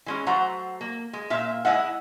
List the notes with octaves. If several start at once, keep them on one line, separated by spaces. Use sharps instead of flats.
E3 G#3 C#4
F#3 A3 C5 F#5 A#5
A#3
G#3
A#2 F4 E5
G#3 E4 D#5 E5 F#5